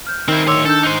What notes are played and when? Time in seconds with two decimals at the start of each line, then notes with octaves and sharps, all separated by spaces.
0.07 F6 G6
0.28 D#3 C4 E4
0.48 D2 C#5 C6 D6 E6
0.66 D4 A4 E6 G6
0.83 D#4 C5 F#6 C7 D#7